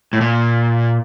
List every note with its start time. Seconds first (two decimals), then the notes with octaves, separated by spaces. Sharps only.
0.13 A2
0.21 A#2